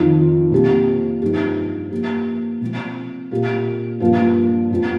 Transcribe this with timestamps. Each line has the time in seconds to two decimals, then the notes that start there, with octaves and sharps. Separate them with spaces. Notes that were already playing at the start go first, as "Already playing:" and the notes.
Already playing: F2 D#3 C4 F4
0.51 C3 F3 A#3 G4
1.22 G2 F3 D#4 G4
1.91 F3 A#3 G4
2.61 C3 F3 C4
3.31 A#2 A#3 G4
4.00 G2 F3 A#3 F4
4.70 F2 F3 C4